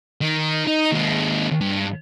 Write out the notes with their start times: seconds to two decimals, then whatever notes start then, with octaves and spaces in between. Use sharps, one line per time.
0.21 D#3
0.67 D#4
0.92 D#2 G#3
1.61 G2